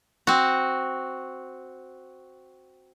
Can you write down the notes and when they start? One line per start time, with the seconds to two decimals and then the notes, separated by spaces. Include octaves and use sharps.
0.27 C4 F#4